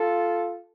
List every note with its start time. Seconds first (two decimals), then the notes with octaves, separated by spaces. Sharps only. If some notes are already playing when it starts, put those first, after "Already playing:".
Already playing: F4 A4